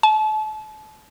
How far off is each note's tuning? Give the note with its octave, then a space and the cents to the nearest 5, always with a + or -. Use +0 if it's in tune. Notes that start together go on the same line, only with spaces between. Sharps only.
A5 -35